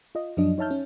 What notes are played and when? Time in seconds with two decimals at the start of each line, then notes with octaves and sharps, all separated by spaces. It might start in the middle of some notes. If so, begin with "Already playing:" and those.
0.15 F4 D#5
0.37 F#2 F3 F#3 D4 D#5
0.58 D#4 C#5 E5 A5 F6 G6
0.71 C#4